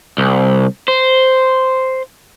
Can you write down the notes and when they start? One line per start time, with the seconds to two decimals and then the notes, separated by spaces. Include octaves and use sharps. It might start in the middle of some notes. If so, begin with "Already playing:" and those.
0.18 C2
0.88 C5